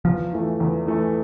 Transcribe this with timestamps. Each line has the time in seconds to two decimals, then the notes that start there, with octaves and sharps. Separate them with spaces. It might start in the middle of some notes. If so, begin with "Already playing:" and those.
0.05 E2 F3
0.33 E3 A3
0.60 E2
0.87 E3 A3